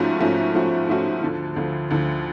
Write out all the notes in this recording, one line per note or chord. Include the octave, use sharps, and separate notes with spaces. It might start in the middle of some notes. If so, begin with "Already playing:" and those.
Already playing: G#2 F3 A3 C#4 F#4
G#2 F3 A3 C#4 F#4
G#2 F3 A3 C#4 F#4
G#2 F3 A3 C#4 F#4
D2 D3 F3
D2 D3 F3
D2 D3 F3